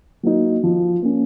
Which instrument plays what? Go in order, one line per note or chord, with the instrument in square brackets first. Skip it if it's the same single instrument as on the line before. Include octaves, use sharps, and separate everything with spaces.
[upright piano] F#3 A#3 D#4
F3
A#3 C#4